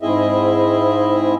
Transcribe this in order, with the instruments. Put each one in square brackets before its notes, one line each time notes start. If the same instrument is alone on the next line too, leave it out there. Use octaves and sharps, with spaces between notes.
[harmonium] G#2 C4 E4 G#4 D#5 E5